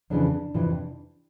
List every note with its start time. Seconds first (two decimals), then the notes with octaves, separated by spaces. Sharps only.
0.10 F2 C#3 E3 D4
0.54 F2 C3 E3